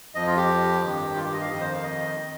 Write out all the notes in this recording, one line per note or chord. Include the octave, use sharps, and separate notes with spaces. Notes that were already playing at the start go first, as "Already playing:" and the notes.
F2 F3 D#5
F4
G4
G2 D#3
F4
G4
D#5
F5
F2 D#3 D#5
C5
F5
D#5
D#3